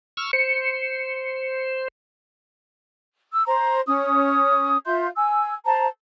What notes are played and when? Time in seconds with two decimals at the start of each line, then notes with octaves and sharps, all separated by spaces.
0.17 C#6 E6 F6
0.33 C5 C#7
3.33 E6
3.47 C5 A#5
3.87 C#4 D#6
4.86 F4 E5 C6 G6
5.16 G#5 E6
5.65 C5 A5 A#5